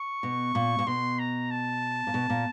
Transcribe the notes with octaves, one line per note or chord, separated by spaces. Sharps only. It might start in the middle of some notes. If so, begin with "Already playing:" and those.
Already playing: C#6
B2
A#2
A#2
B2 C6
A#5
A5
A#2
B2
A#2